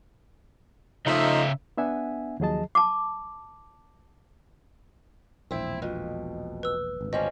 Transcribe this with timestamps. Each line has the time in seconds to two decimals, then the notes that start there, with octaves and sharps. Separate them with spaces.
1.06 C#3 F3 A3 D#4 E5
1.77 B3 D4 E5 F#5 G#5
2.40 D#2 F3 F#3 G#4 D#5 A5
2.75 A5 D6
5.51 E1 A#1 C4 E4
5.82 F2 B2
6.63 B4 E6
7.01 G#1 D2
7.13 F3 G3 C#4 D#5